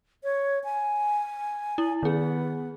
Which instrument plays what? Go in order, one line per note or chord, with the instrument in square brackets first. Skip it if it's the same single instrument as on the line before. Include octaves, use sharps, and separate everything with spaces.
[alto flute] C#5
G#5
[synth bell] E4
[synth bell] D#3 G#4 [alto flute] B3